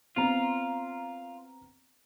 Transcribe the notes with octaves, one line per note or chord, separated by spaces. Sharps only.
B3 C4 F4 A#5